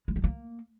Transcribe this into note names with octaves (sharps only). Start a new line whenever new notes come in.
G#3
G3
A#3